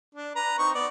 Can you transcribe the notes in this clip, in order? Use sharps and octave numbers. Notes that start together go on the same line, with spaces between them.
D4
B4 A#5
C4 D#4 C#6
B3 D5